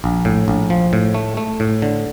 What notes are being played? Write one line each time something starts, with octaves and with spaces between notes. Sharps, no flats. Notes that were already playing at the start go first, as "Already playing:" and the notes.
A#1
A2
A#1
F3
A2
A3
A3
A2
D3